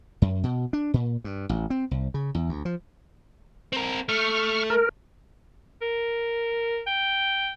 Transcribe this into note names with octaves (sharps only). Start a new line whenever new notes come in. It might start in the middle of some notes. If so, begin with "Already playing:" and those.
F#2
B2
D4
A#2
G2
A1
C4
C2
C#3
E2
D2
F3
C4 A#4
A3 C#6 F6
A#4
A#4
G5